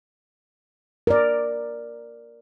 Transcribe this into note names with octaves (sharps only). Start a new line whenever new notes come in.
A#4 D5